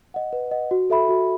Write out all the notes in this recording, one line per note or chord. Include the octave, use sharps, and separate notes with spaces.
D#5 F#5
B4
D#5 F#5
F#4
A4 E5 B5
F#4